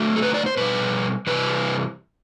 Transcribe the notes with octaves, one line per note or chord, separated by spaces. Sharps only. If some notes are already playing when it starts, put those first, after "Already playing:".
Already playing: D3 F#3 A3
A4
B4
D5
C5
B2 G3 B4
C3 E3 G3 B4